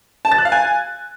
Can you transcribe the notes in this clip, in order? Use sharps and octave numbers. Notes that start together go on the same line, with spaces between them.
A5
A6
F#6
F5
G#5